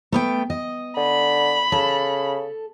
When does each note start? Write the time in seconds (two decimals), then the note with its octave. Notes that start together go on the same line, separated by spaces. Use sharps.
0.12 A3 B3 G5
0.50 D#5
0.97 D3 B5
1.72 C#3 A4